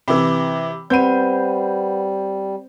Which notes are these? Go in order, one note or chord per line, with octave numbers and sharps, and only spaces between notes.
C3 E3 B5 D6 E6
G3 C4 B4 F#5 B5 G6 D#7